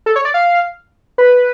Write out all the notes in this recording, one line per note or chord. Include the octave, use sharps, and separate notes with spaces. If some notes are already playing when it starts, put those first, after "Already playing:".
A4
C#5
D5
F5
B4